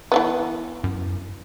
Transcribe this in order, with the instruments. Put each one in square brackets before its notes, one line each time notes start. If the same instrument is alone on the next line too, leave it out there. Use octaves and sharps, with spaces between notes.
[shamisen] E3 A3 B3
[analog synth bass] F#2